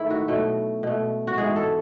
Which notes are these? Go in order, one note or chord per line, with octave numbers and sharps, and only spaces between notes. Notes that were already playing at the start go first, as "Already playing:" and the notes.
Already playing: G#2 D#3 A3 E4
F#4
B2 F#3 A3
B2 A3
F#4
G#2 E3 G#3 G#4
A4